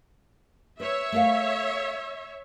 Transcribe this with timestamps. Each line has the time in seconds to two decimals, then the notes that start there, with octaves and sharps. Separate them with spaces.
0.80 B4 C#5 E5
1.12 A3 A#4 F5